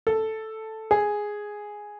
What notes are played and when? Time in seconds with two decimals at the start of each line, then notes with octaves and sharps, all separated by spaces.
0.07 A4
0.91 G#4